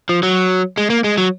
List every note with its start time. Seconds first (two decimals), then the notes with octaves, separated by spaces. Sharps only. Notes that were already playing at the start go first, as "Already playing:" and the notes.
0.09 F3
0.23 F#3
0.77 G#3
0.90 A#3
1.04 G#3
1.18 F#3